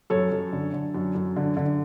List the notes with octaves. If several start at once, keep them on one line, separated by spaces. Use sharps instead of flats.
F#2 A4 C#5
F#2
D3
D3
F#2
F#2
D3
D3